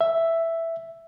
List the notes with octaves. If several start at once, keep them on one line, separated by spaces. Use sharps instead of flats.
E5